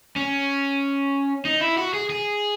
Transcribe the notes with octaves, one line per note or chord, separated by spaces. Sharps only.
C#4
D#4
E4
F#4
G#4
G#4